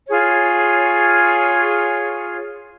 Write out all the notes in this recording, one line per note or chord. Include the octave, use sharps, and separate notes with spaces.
F4 G#4 C#5